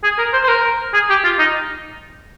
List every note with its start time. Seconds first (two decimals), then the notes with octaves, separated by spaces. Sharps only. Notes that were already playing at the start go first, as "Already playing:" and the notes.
0.03 G#4
0.18 A#4
0.33 C5
0.43 C5
0.48 A#4
0.94 G#4
1.10 G4
1.24 F4
1.39 D#4